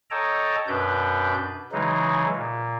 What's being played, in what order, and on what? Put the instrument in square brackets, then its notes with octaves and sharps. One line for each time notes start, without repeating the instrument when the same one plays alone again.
[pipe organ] A4 C#5 D#5 G5 A5 A#5
F#2 B2 D4 B4 G6
C#3 E3 F#3 G#3 D#4
A#2